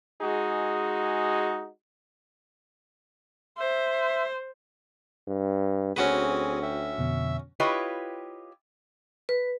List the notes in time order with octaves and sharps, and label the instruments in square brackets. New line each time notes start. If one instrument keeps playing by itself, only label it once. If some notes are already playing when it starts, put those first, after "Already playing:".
[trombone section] G#3 D#4 F#4 G#4
[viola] C5 [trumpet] E5
[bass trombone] G2
[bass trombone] D2 [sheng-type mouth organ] C4 G#4 [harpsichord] C#4 F#4 B4
[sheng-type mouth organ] E5 [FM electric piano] G5
[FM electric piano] F2 B2 D3
[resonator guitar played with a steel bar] E4 F4 G4 B4 C#5 D#5
[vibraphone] B4